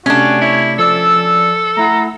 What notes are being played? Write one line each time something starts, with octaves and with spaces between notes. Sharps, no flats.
C3 A3 C#4 D4 F#4
E4 C#5
F3 A4 D5 E6
A3 E4 F#5 A#5